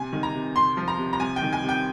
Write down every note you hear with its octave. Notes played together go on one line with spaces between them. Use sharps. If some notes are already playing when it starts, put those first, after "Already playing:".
Already playing: C3 G#5
D#3
A#5
C3
C3 C6
F3
A#5
C3
A#5
C3 G#5
G5
D#3
G#5
C3
G5